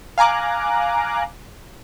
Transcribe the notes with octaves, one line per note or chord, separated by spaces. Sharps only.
F5 G#5 A#5 D6 F#6